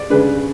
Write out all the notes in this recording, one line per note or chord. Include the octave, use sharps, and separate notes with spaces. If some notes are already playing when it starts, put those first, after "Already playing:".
Already playing: D5
C#3 G#3 D4 B4